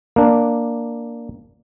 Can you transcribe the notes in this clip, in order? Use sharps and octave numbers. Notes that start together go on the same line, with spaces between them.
A#3 D4